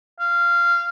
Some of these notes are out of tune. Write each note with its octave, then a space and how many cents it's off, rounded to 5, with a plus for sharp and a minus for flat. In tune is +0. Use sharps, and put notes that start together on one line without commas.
F5 -15